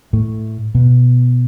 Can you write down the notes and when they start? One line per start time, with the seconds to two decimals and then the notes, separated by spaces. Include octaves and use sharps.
0.13 A2 A3
0.75 B2 B3